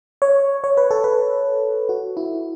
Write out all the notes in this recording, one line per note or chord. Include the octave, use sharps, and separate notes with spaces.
C#5
C#5
B4
A4
B4
F#4
E4